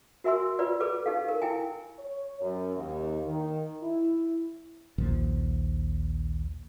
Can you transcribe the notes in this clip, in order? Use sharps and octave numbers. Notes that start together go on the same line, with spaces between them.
F#4 A#4 E5 G#5 C6 E6
F4 B4 D5 E6
G#4 A4 B4 D6
D#4 G4 A4 F5
A#4
E4 G5 G#5
C#5
F#2
D#2
D#3
E4
A#1 D#2 A#2 F3